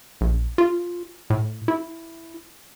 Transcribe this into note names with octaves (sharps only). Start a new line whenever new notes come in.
A#1
F4
A2
E4